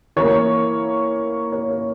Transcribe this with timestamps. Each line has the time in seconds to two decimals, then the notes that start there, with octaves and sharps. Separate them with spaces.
0.16 E3 A#3 C#5
1.52 C#5
1.70 C#5